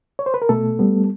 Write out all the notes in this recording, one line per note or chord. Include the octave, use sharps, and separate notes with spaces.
C#5
C5
B4
A#4
B2 A3 A4
G3 B3